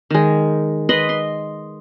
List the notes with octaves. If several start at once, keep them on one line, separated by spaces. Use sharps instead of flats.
D#3 G#3
B4 D#5 B5 C6
C6